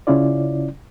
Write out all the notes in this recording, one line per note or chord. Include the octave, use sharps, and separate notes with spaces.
C#3 C#4 E4 F4 D5